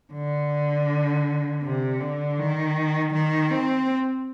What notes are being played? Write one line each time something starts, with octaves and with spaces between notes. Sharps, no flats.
D3
C3
D3
D#3
D#3
C4